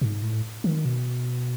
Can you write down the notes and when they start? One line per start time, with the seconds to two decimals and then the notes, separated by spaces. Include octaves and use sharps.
0.01 G#2
0.23 A2
0.64 D#3
0.85 B2